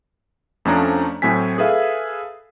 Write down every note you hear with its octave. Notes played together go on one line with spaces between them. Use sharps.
F2 F3 A3 C#4 D4 A#5
A2 F#3 C4 G#5 B6
G#4 A4 B4 E5 F5